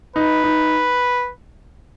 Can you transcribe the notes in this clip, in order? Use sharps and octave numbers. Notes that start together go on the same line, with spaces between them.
D#4 B4
D#4